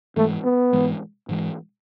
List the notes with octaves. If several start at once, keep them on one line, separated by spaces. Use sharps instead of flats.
G#2 E3 G#3 A3
B3
G#2 E3 G#3
G#2 E3 G#3